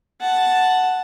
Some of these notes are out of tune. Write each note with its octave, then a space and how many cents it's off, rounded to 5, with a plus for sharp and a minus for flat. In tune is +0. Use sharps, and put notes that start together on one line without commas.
F#5 +0 A5 +0